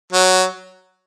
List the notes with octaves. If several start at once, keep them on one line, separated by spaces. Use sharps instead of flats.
F#3